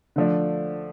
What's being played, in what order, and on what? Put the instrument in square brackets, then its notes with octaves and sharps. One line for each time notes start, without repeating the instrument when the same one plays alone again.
[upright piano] D3 F3 A3 D4